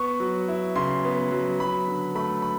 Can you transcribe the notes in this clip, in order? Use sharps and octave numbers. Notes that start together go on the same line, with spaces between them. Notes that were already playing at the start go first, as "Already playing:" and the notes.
Already playing: B3 C#6
F#3
E4
C#3 C6
B3
F#3
F#3 B5
D3
A3 B5
B5